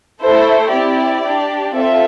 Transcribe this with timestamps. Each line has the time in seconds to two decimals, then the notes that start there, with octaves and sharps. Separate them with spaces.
0.23 A3 E4 A4 C5
0.73 C4 E4 G4 D5
1.24 D4 G4
1.74 C4 F4 A4 E5